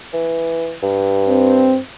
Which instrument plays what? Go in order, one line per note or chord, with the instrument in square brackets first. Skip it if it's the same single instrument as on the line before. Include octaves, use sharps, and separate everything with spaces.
[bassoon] E3
G2
[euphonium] C4